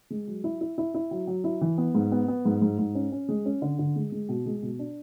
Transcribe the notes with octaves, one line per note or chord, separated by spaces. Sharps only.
G#3
F#3
E4
E4
E4
E4
F#3
F#3
E4
E3
B3
G#2
B3
B3
G#2
G#2
G#2
C#4
C#4
G#3
C#4
D3
D3
G#3
G#3
B2
G#3
B2
D4